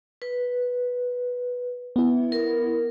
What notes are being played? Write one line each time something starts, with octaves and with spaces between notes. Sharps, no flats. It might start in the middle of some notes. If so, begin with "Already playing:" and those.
B4
B3 E4
A#4